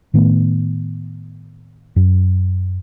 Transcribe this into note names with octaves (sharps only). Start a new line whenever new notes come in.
A2 D#3 A3 B3
F#2